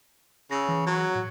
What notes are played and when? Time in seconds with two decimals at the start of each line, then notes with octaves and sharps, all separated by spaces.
0.51 C#3 E6 A#6
0.69 E3
0.87 F#3
1.15 A2